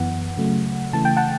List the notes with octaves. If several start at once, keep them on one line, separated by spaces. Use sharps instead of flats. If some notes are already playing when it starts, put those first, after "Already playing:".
Already playing: F#2 E3 B3 F#5
C#3 F#3 A3
C#3 E3 A3 A5
G5
F#5 A5